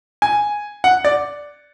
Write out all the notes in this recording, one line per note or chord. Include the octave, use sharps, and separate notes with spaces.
G#5
F#5
D5